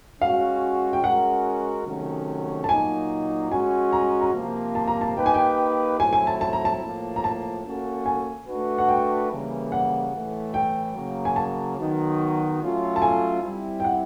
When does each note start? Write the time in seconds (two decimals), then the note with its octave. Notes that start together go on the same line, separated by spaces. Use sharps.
0.21 G#3 C#4 F#4 F5
0.93 G5
1.03 G#3 C#4 F#4 A#4 F#5
1.86 C3 D#3 F#3 A3 C#4
2.64 A5
2.69 A#2 F#3 A#3 D#4 G#5
3.51 G#3 C#4 F#4 G#5
3.93 A#5
4.21 A#5
4.34 C3 F3 A#3
4.75 A5
4.88 A#5
5.01 A5
5.17 A#3 D#4 G4 B4 G5
5.26 G#5
5.34 G5
5.99 F#3 A3 C4 E4 G#5
6.13 G#5
6.27 A5
6.41 A5
6.53 A#5
6.65 A5
6.82 A2 F3 A#3
7.16 A#5
7.24 A5
7.65 A#3 C#4 F#4 A4
8.06 G#5
8.48 A3 D4 F#4 B4
8.78 F#5
8.89 G5
9.30 C#3 E3 G3 A#3
9.72 F#5
10.12 A2 E3 A3
10.54 G5
10.95 C#3 F#3 A#3
11.25 G#5
11.36 A5
11.78 D#3 F#3 B3 D#4 F#4
12.61 F#3 A3 C#4 F4 A4
12.96 A5
13.02 G#5
13.43 G3 C4 E4
13.80 G5
13.84 F#5